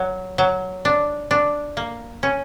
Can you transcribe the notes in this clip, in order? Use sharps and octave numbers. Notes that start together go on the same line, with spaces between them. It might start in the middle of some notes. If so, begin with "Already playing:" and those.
Already playing: F#3
F#3
D4
D4
A#3
C#4